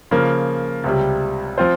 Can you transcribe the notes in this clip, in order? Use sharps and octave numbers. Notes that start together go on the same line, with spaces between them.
C#3 F3 A#3
C#2 C3 G3
F3 C4 F4 C5